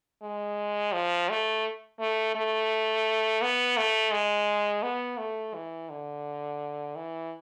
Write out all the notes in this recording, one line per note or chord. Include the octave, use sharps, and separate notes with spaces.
G#3
F3
A3
A3
A3
B3
A3
G#3
B3
A3
E3
D3
E3